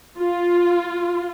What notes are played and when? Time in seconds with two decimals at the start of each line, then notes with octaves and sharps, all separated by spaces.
0.17 F4